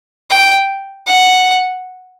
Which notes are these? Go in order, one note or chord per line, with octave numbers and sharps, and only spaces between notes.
G5
F#5